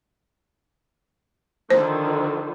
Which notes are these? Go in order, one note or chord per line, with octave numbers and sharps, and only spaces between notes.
D3 D#3 F3 C5